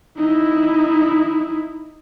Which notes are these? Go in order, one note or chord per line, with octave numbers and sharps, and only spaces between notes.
D#4 E4